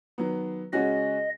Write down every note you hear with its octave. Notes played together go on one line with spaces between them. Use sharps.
D#3 F#3 B3
C#3 G#3 C#4 F#4 D#5